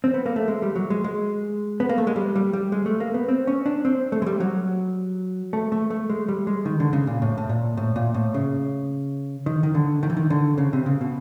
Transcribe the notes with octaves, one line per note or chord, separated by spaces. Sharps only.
C4
B3
A#3
A3
G#3
G3
F#3
G#3
G#3
B3
A#3
A3
G#3
G3
G3
G3
G#3
A3
A#3
B3
C4
C#4
D4
C4
A3
G#3
G3
F#3
A3
A3
A3
G#3
G3
G#3
D#3
D3
C#3
A#2
A2
A2
A#2
A2
A#2
A2
C#3
D#3
D#3
D3
D#3
E3
D#3
D3
C#3
C3
C#3
B2